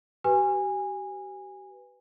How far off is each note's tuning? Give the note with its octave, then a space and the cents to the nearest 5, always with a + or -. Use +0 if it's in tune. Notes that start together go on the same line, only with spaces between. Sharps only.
G4 -40 B4 +0 G#5 -20